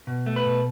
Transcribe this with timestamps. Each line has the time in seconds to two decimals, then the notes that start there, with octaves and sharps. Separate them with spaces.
0.07 B2
0.26 A3
0.36 B4
0.46 B2